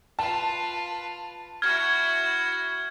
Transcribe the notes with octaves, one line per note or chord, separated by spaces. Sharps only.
F4 B4 A5
E4 F#4 F6 G#6